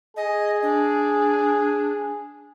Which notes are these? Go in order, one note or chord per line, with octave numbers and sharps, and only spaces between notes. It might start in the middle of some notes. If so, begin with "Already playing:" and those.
G#4 D#5
D4